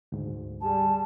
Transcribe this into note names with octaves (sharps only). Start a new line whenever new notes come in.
D2 G#2
G3 G#4 A5